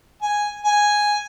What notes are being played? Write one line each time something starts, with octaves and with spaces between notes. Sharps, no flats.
G#5
G#5